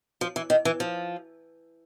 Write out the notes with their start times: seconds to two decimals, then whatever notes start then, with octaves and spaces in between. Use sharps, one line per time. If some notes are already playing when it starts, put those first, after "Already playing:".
0.21 F3
0.36 E3
0.50 D#3
0.65 E3
0.80 F3